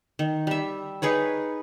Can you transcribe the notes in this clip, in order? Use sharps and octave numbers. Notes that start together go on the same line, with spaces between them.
D#3
G3 E5
D#4 G#4 B4 C#5